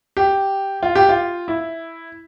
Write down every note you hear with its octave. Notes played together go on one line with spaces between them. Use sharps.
G4
F4
G4
F4
E4